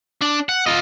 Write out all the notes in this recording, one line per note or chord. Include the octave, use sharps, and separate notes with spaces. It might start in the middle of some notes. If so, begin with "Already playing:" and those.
D4
F#5
F4 D#5